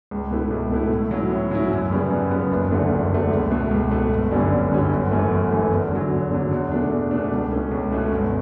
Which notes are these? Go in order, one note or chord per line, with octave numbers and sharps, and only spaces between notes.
C#2
B2 A3 E4
C#2
B2 A3 E4
A2
F#3 C#4 E4
A2
F#3 C#4 E4
F#2
C#3 G3 B3
F#2
C#3 G3 B3
F#1
E2 D3 A3
F#1
E2 D3 A3
C#2
B2 A3
C#2
B2 A3
G1
F#2 D3 G3 C#4
G1
F#2 D3 G3 C#4
G1
F#2 E3 A3
G1
F#2 E3 A3
E2
D3 F#3
E2
D3 F#3
E2
B2 A3 D4
E2
B2 A3 D4
C#2
B2 A3 C#4
C#2
B2 A3 C#4
G1